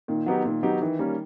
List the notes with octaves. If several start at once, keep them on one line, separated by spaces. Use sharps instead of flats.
A#2 D#3
F#3 B3 D#4 G4
A#2 D#3
F#3 B3 D#4 G4
D#3 E3
G3 A#3 C#4